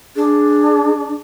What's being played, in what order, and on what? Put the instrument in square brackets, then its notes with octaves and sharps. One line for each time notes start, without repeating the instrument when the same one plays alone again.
[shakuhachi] D4 [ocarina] G#4